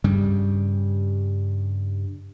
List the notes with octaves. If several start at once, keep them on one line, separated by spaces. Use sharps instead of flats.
G2 C#3 G3